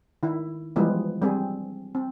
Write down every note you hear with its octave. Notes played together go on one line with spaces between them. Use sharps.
D#3 E4
E3 F3 G3 G#3 B3
G3 C4 G#4
C4